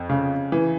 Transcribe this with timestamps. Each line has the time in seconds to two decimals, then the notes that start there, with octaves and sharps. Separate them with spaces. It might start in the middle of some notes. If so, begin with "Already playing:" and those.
Already playing: F2
0.09 C#3
0.52 E3